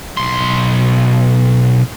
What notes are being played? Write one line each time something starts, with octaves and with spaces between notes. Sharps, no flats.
B1 C6